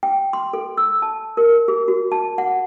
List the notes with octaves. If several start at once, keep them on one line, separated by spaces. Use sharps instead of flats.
G5
C6
A4
E6
A5
A#4
G#4
F#4
A5
F#5